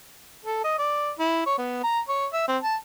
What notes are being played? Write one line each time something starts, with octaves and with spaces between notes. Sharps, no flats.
A4
D#5
D5
E4
C#5
B3
A#5
C#5
E5
C4
A5